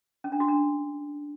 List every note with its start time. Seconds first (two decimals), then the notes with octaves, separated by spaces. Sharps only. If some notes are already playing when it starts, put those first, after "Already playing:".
0.24 C#4
0.32 D4
0.40 F#4
0.48 D4